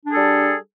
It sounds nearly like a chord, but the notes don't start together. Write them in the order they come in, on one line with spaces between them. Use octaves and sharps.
D4 G#4 A4 G3